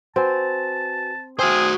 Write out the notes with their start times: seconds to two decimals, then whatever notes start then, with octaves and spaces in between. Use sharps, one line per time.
0.16 C4 F#4 B4 G#5 A5
1.39 F#4 G#4 C5 G5 G#5 E6